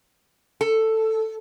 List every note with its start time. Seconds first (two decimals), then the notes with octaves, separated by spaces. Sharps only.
0.61 A4